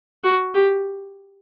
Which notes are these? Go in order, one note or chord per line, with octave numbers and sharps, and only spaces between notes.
F#4
G4